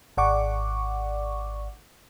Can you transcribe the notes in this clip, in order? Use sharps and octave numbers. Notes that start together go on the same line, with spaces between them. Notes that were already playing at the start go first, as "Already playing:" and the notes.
G#1 D5 F#5 C#6 D6